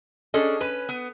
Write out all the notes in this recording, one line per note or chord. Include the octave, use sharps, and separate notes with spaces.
C#4 D4 G#4 A4 D#5
C#4 B4 D#7
B3